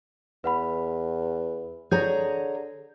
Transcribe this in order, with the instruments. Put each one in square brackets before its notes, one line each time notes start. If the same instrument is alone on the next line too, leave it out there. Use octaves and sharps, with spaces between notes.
[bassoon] E2 [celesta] B4 F#5 B5
[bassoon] D3 [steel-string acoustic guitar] G#4 C#5 A#5 [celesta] G6